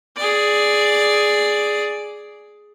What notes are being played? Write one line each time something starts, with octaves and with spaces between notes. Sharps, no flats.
G#4 D5